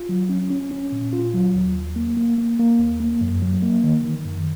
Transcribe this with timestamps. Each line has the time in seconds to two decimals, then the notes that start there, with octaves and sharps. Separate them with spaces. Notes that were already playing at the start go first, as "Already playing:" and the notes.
Already playing: F4
0.09 F#3
0.29 C#4
0.50 C#4
0.71 C#4
0.92 A#2
1.13 F4
1.34 F#3
1.54 D#2
1.75 D#2
1.96 A#3
2.17 A#3
2.38 A#3
2.59 A#3
2.79 D#2
3.00 A#3
3.21 F#2
3.42 F#3
3.62 A#3
3.84 D#3
4.05 D#3
4.25 F#2